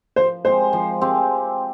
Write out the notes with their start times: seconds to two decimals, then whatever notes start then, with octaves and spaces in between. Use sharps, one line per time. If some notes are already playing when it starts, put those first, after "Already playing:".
0.16 F3 C5
0.45 G#3 C4 G4 C5
0.73 F3
1.01 G#3 C4 G4